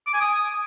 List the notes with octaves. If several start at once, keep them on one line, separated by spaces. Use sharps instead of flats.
D6
G#5
D#6